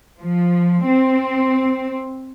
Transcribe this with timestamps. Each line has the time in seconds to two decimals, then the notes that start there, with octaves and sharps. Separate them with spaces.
0.19 F3
0.85 C4